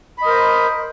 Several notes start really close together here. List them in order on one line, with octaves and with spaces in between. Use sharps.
B5 D#5 A#4 C5